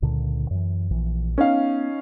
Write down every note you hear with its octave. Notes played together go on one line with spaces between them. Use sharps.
C#2 A#2 D3
F#2 E3
A#1 E3
B3 C#4 D#4 F5